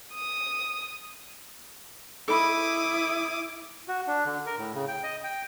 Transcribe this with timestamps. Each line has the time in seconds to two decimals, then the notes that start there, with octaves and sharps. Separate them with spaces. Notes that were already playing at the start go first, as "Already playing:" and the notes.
0.14 D#6
2.28 E4 A4 D#5 B5 D6 D#6
3.88 F#4
4.08 D4
4.25 D3
4.46 A#4
4.58 A2
4.75 C#3
4.88 G5
5.03 D#5
5.24 G5